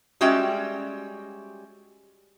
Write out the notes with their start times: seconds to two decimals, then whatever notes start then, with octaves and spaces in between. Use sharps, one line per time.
0.21 G3 G#3 C#4 F#4 E5 G5